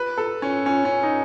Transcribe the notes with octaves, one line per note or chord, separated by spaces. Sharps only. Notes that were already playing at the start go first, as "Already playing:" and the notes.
Already playing: B4
A4
C#4
C#4
C#4
D#4